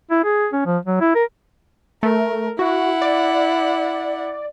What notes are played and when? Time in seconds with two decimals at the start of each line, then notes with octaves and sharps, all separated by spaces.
0.11 E4
0.24 G#4
0.53 C#4
0.66 F3
0.86 F#3
1.01 E4
1.15 A#4
2.03 A3 A#4
2.59 E4 F#4 F#5
3.02 D5